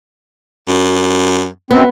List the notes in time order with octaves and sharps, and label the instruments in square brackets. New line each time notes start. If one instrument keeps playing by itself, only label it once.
[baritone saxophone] F#2
[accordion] F#2 C4 [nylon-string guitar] B3